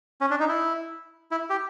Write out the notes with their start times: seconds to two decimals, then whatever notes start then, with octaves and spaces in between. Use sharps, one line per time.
0.21 C#4
0.30 D4
0.40 D#4
0.48 E4
1.31 E4
1.50 G4